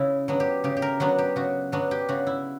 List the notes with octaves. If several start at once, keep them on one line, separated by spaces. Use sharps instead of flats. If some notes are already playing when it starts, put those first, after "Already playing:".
Already playing: C#3 E4
F#3 B3 D4
G4
C#3 G4
G4
A#4
F#3 B3 D4 F#4
G4
C#3 F#4
F#3 B3 D4 F#4
G4
C#3 F#4
E4